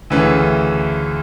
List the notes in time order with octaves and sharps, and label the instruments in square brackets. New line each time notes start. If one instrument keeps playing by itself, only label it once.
[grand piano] D2 C#3 E3 A3 C#4